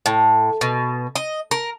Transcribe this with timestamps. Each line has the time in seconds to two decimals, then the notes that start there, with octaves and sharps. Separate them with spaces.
0.06 A2
0.61 B2
1.15 D#5
1.51 A#4